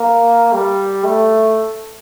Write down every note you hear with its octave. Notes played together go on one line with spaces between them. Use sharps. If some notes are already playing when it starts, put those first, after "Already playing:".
Already playing: A#3
G3
A3